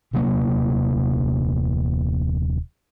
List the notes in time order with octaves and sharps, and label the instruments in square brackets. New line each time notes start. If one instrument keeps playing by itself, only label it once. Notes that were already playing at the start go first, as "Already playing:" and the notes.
[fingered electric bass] D#1 C3 F#3 A#3